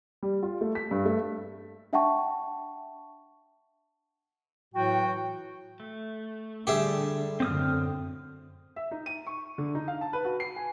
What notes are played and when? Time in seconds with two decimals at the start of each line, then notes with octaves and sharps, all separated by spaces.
0.23 G3
0.43 F4
0.61 A3
0.75 B6
0.91 G2
1.05 A3
1.93 D4 E5 F#5 G5 A5 C#6
4.74 A2 E3 F#3 F#4 G5
5.80 A3
6.67 D3 G3 G4 G#4 E5
7.40 F#2 A2 D3 C4 D#6 F6
8.76 E5
8.91 D#4
9.06 D#7
9.27 C#6
9.58 D3
9.75 D#4
9.88 F5
10.01 A5
10.13 B4
10.25 F#4
10.40 C7
10.56 G#5